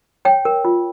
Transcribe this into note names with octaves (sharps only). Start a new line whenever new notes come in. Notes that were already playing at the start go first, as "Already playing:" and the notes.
C#5 G5
A#4
F4